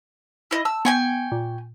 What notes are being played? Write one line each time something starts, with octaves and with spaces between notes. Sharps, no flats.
E4 D#5
A5 E6
B3 G5 G#5 C#6
A#2